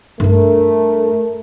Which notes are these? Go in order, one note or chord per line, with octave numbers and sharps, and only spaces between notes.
G2 A3 D4 A#4